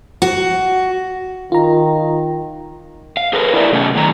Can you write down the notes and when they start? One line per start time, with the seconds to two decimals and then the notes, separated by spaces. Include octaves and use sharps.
0.22 F#4
1.52 D#3 F4 A#5
3.17 F5
3.33 G#4 A#4 B4
3.54 E4 G#4 A#4 D5 E5
3.72 C3 A3 C#4
3.96 A2 D#3 F#3 A#5